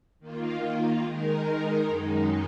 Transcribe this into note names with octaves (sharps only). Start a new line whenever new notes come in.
D#3 A#3 F4
D#3 G#3 D#4 A#4
F#2 D#3 G#3 D#4